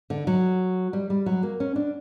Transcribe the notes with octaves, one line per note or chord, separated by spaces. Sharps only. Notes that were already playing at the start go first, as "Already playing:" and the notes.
D3
F#3
G3
G3
F#3
A#3
C#4
D4